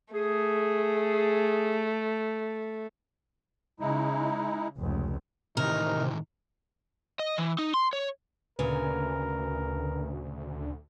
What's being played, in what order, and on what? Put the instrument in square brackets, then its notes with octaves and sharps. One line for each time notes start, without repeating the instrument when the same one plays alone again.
[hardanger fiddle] A3 [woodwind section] G#4
[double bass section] C#3 [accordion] G#3 D#4 E4
[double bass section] F1 C#2
[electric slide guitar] A2 D#3 E3 [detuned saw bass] C3 [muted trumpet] D#4 [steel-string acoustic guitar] A#4
[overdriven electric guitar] D#5
E3
D#4
C6
C#5
[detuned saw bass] D2 [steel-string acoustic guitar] A#2 C#3 G#5 [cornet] A#4 [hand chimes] B4